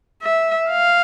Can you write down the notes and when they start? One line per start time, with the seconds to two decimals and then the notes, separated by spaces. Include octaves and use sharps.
0.22 E5
0.69 F5